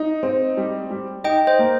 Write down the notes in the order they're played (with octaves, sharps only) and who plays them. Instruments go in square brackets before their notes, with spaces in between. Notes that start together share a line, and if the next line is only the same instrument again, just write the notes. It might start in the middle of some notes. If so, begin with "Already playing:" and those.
Already playing: [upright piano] D#4
C4
G3
G3
[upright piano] D#4 [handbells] D#5 G5
[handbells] C5 D#5
[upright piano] A#3